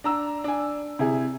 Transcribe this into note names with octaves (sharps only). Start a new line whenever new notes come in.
D4 A#5 E6
D4 G#5
C3 E4 G#4